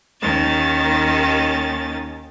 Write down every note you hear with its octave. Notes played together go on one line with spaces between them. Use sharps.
D#2 D#3 C#4 A6